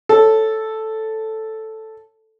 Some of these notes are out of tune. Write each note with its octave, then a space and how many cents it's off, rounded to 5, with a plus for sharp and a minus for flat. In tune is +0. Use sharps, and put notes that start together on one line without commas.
A4 +0 C#5 -5